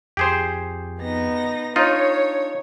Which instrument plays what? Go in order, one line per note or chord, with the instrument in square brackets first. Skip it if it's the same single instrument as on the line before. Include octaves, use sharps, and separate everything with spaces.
[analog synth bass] F2 [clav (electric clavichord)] G4 G#4 C5
[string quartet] B3 D#4 A#6
[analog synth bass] D4 [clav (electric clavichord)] D#4 F4 [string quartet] C#5